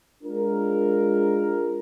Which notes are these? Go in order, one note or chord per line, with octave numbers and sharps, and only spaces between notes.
G#3 D4 F4 A#4